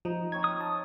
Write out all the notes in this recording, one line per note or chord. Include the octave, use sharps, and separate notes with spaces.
F3 D#4
C4 C#5 A#5 G#6
D#6
A5